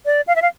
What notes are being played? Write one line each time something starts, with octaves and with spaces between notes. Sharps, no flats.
D5
F5
E5
F5